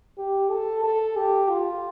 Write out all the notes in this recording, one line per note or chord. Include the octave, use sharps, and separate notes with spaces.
G4
A4
A4
G4
F4